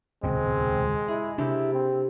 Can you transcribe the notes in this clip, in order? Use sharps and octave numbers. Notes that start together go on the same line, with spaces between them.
D#1 C#2 B2 G#3 C4
E4 G#4
C3 D4 E4 G4 A4
C4